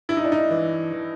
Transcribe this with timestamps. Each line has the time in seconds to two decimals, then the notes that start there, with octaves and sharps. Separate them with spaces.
0.09 G2 E4
0.17 D#4
0.24 D4
0.32 D#4
0.51 E3
0.93 E3